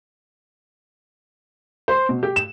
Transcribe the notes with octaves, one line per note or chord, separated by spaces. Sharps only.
C5
B2
G4
E7